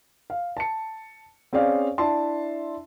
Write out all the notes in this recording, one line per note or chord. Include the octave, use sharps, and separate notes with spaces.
F5
A5 C#7
C4 C#4 G#4 D5 F5
D4 E4 E5 A5 C6